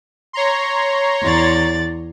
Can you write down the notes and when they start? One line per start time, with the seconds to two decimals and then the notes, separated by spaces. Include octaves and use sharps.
0.33 C#5 A#5 C6
1.23 E2 D5 A6